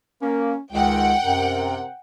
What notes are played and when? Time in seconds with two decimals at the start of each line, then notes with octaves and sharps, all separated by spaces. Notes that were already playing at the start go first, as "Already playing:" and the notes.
0.22 A#3 C#4
0.72 C#2 D#3 G#3 F#5 G5
1.23 F#2 C3 A#4